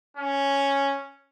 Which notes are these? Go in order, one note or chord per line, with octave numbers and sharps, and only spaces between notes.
C#4